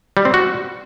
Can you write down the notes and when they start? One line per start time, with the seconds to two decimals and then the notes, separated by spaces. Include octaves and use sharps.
0.17 G3
0.25 C4
0.34 F#4